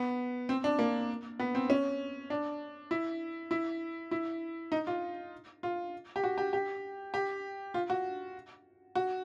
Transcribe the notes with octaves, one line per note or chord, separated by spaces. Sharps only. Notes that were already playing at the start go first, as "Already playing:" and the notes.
Already playing: B3
C4
D4
A#3
B3
C4
C#4
D4
E4
E4
E4
D#4
F4
F4
G4
F#4
G4
G4
G4
F4
F#4
F#4